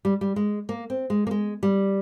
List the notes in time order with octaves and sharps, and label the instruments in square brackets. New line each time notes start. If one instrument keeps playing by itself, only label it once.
[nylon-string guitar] G3
G3
G#3
A#3
C4
G#3
A#3
G#3
G3